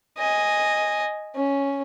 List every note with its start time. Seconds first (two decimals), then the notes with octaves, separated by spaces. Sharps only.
0.18 D#5 G#5
1.36 C#4